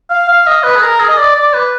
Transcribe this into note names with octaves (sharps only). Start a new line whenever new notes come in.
F5
F5
D#5
B4
G#4
A#4
G#4
D#5
D5
D5
B4